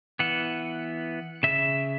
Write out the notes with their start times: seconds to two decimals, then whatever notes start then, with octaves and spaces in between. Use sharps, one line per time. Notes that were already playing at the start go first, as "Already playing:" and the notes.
0.19 E3 B3 F#5
1.43 C#3 E5